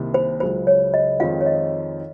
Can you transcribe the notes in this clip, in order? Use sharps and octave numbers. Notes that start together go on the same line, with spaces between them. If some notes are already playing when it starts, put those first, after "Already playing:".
Already playing: C2 C3 D#3 A#3
C5
C#2 C#3 F#3 C5
C#5
D#5
F2 D#3 G#3 C4 F4 F5
C#5
D#5